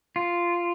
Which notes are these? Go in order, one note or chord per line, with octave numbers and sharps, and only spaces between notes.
F4